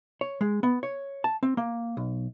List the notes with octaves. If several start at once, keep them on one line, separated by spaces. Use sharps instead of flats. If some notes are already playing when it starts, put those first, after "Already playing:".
C#5
G#3
B3
C#5
A5
C4
A#3
B1